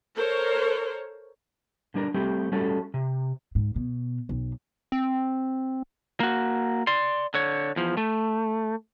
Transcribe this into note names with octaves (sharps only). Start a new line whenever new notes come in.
A4 A#4 C5 C#5
D3 G3 D4 A#4
G3 A3 C4 G4
G3 A3 C#4 F#4 A4
C3
G#2
B2
B1
C4
A#3 F#4
D5 C6
D3 C#5
E2 F3
A3